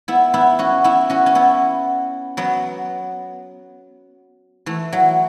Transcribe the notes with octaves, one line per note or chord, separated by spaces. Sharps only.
B3 E4
B3 E4
C#4 F#4
B3 E4
C#4 F#4
C#4
B3 E4
F#3 B3
E3 A3
F#3